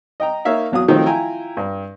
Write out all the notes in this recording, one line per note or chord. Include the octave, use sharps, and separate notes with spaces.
D#5 G5 A#5
A#3 D#4 C#5 E5 F5
E2 F#3 F5 D#6
D#3 F3 F#3 A3 C4 D#4
E4 F4 G5 G#5 A#5
G2